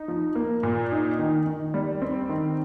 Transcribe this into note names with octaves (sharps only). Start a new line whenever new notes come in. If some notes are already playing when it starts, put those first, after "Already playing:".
Already playing: D#4
F3
A#3
A#2
D#4
D#3
D#3
G3
C4
D#3